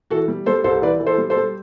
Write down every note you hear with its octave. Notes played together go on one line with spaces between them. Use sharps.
E3 F#4 A4
G3
G3 A4 C5
C2 A4 C5
E3 B4 D5
E3
A4 C5
G3
A4 C5
G3